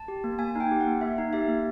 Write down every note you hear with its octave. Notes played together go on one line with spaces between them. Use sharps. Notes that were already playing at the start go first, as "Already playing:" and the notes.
Already playing: A5
G4
A#3
A#3 G#5
D#4 G5
G4
F#5
A#3
A#3 E5
D#4
G4 E5
A#3